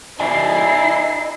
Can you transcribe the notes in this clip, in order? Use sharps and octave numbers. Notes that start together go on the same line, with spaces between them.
D#4 E4 D5 D#5 G#5 C7